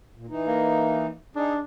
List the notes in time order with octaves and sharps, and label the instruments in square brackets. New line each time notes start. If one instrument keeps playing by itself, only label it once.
[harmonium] A#2
E3 D#4
[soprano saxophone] A#3
[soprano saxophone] D4 [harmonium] D#4 G#4